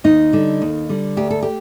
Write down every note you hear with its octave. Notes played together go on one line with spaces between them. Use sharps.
D#2 D#4
D3 G3
D#2
D3 G3
D2 G4
A4
G4